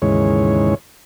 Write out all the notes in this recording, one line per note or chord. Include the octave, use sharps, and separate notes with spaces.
D#2 G#2 C#3 E3 G#3 C#5